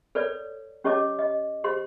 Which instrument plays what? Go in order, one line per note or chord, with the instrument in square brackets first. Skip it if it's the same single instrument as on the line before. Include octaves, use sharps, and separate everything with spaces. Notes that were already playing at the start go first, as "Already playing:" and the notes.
[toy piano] A4 B4 C#5 D5
C#4 G4 C#5 D#5 A5 D6
D#5
G4 C5 C6